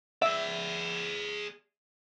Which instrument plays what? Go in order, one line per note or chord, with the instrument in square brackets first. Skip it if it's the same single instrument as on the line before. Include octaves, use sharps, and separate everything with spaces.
[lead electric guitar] G#4 D5 [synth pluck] E5